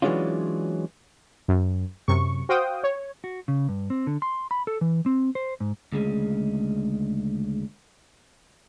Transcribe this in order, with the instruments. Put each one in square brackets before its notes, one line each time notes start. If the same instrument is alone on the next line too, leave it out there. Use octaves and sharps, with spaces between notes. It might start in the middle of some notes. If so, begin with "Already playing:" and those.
[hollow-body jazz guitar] E3 F#3 G#3 C#4 D4 F4
[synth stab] F#2
F#2 C3 C#6
F#4 C5 F5 G5 D#6
C#5
[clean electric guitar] F#4
C#3
G2
C4
D3
C6
B5
A4
E3
C4
C5
G#2
D2 C#3 G#3